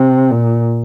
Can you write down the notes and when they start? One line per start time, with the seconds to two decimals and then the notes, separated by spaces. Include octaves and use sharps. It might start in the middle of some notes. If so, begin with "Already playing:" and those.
Already playing: C3
0.30 A#2